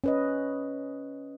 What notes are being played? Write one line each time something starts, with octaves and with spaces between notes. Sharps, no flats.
C#4 B4 D#5